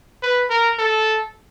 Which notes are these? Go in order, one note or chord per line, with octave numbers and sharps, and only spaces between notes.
B4
A#4
A4